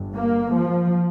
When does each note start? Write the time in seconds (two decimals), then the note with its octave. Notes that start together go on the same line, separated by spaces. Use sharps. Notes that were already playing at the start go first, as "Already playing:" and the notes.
Already playing: G1 G2
0.14 A#3
0.53 F3